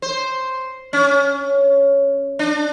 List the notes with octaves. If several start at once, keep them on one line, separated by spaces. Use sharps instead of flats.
C5
C#4
D4